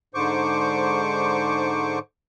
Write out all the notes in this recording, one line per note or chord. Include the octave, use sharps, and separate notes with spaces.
G#2 D3 C5 C#6 D6